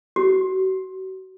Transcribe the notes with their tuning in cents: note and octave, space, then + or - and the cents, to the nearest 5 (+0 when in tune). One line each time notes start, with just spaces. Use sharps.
F#4 +35